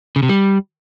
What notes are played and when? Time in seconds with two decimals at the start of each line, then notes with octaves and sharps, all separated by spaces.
0.16 C#3
0.23 C3
0.29 G3